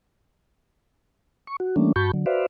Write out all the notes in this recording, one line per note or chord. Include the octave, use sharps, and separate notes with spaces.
C#6
F#4
E3 G3 A3 A#3 C#4 D4
G2 F#4 A5 B5 C#6 G6
D3 F#3
F#4 B4 C5 D5 E5 F5